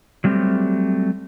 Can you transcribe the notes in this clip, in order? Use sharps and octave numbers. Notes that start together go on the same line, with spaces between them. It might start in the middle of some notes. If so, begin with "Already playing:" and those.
F#3 G3 A3 C4 G4